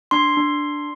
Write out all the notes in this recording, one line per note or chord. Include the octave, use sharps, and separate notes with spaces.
D4 C6
D4